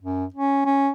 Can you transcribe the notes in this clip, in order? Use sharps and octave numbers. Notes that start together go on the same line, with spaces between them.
F#2
C#4
C#4